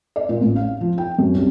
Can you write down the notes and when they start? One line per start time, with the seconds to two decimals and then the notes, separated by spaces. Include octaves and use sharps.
0.16 D5
0.29 A#2
0.41 A1
0.56 F5
0.81 F3
0.98 G5
1.18 F#2
1.35 C2